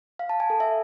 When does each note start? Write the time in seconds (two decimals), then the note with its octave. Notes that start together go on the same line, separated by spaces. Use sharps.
0.19 F5
0.29 A5
0.40 G#5
0.50 A4
0.60 E5